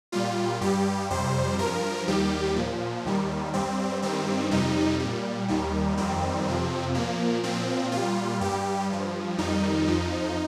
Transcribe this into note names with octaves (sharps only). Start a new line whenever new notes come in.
A#2 G3 F4
G2 G3 G4
F2 C3 G3 C5
G2 F3 A#4
D#2 D#3 G3 G4
A#2 F3
D#2 D#3 G3
G2 G3 C4
G2 D#3 G3 C4
F2 C3 G3 D#4
A#2 G3
D#2 D#3 G3
F2 D#3 G3 C4
F2 C3 F3
A#2 F3 A#3
A#2 F3 C4
A#2 G3 F4
G2 G3 G4
G2 F3
F2 D#3 G3 D#4
F2 F3